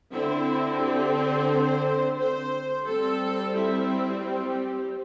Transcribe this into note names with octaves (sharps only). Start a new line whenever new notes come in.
D3 C4 E4
G4
C5
C5
G3 C4 A4
E4
G4